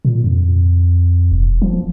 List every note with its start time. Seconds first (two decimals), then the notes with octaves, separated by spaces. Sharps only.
0.05 A#2
0.24 F2
1.32 E1
1.62 F3